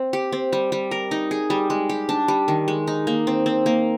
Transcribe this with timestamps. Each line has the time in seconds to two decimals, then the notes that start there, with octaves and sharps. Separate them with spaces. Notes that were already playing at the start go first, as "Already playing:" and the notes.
Already playing: C4
0.13 G4
0.32 C4
0.53 G3
0.72 G3
0.91 A#4
1.11 D#4
1.31 G#4
1.50 G3
1.70 G#3
1.89 G4
2.09 D4
2.28 G3
2.48 D#3
2.68 G#3
2.87 D#4
3.07 A#3
3.27 C4
3.46 C4
3.66 A#3